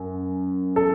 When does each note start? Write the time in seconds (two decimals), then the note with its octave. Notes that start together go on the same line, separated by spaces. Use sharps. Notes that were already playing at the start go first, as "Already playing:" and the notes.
Already playing: F#2
0.76 A4